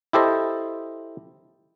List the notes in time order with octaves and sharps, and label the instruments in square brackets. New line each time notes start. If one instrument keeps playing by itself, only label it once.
[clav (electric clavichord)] E4 G4 A4 C5 D#5